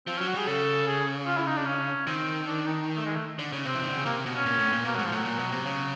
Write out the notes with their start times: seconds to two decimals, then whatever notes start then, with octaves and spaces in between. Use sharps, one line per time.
0.07 F3 C4
0.18 F#3 C#4
0.27 F#4
0.34 G3 G#4
0.47 C#3 A4
0.87 G#4
1.27 F4
1.37 E4
1.46 D#4
1.57 D4
1.66 C#4
2.07 D#3 C4
2.47 D4
2.66 D#4
2.97 A3
3.06 G#3
3.16 A3
3.39 D3
3.52 C#3
3.65 C3 C4
3.74 E3
3.82 D#3
3.89 D3
3.97 C#3
4.05 C3 A#3
4.26 B2
4.36 C#4
4.45 A#2
4.59 A2
4.73 A#2
4.85 B2 A#3
4.95 G#2 F#3
5.05 F3
5.12 A2 F#3
5.25 A#2
5.39 B2
5.52 C3
5.66 C#3